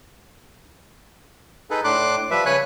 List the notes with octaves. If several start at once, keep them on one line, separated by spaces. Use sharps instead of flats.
D#4 G#4 A4 B4
A2 D4 C6 D6 F#6
F3 G3 B4 E5
C#3 B4 C#5 G#5 F#6